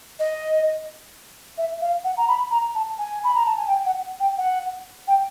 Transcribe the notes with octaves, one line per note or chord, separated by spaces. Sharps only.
D#5
E5
F5
F#5
A#5
B5
A#5
A5
G#5
B5
A#5
A5
G#5
G5
F#5
G5
F#5
G5